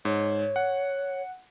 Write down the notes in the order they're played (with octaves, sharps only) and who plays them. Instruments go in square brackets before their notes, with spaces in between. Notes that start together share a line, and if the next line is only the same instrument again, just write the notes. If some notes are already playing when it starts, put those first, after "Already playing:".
[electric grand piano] G#2 [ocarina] C#5
[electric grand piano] F#5